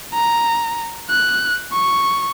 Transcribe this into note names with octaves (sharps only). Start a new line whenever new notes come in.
A#5
F#6
C#6